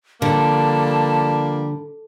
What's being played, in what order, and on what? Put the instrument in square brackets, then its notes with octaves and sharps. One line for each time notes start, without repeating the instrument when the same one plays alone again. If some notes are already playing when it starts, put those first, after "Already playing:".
[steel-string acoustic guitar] D3 [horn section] F3 G3 A#3 [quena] A5